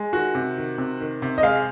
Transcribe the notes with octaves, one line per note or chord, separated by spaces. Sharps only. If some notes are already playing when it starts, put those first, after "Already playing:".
Already playing: G#3
D#3 F#4
C3
D#3
C3
D#3
C3
D#5
G#3 F5